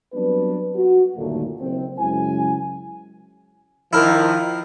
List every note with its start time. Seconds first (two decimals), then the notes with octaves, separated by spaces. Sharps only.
0.14 F#3 G3 B3 C4 D4 B4
0.75 F#4
1.16 G1 D#2 A#2 A3
1.60 F#1 C4
1.98 F#2 C#3 G#3 E4 G#5
3.93 D#3 F3 E4 A#4